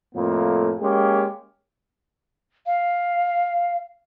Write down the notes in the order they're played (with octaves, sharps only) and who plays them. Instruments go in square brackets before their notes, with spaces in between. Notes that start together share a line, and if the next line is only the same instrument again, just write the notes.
[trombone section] F2 A2 A3 A#3
G#3 A#3 C#4 G4
[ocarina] F5